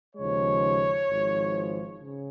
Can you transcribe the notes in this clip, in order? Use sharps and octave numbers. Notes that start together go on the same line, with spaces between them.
D#2 C#3 F3 G#3 C#5
G#1 G#2 F3
C#3